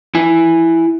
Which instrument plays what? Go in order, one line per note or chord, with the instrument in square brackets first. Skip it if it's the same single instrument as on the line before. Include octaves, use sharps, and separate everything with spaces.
[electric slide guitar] E4 G#5